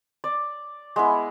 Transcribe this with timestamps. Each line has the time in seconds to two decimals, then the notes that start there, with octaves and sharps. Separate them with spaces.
0.24 D5
0.96 G#3 B3 E4